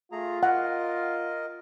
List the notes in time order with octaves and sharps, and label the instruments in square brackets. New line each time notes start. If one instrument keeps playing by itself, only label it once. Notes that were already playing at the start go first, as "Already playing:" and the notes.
[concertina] A3 G#4 A#5 [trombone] F4
[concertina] A#4 D#5 [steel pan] F#5